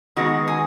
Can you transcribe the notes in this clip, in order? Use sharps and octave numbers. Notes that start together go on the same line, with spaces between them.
D#3 G#3 B3 F#4
G#4